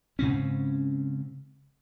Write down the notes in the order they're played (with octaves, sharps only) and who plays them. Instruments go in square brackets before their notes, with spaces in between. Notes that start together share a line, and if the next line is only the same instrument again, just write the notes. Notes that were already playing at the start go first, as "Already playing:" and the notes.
[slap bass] G#2 C#3 C4 C#4